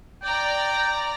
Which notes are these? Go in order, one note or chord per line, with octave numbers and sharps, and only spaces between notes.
D5 G5 A#5